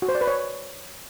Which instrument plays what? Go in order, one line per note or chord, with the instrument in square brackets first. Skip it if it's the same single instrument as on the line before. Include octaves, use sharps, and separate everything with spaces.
[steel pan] F#4
C5
D5
B4
C#5